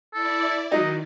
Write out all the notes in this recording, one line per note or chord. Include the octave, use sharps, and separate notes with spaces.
E4 A4 D5
D#3 F#3 D#4 D#5